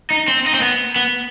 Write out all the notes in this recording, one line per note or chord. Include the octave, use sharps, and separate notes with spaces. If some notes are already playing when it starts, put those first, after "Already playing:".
D#4
C4
D#4
C4
B3
B3